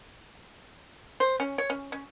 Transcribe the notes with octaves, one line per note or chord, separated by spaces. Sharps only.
C5
C#4
C#5
C#4
C#4